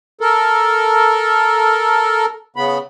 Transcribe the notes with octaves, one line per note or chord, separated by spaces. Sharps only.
A4 A#4
C#3 B3 B5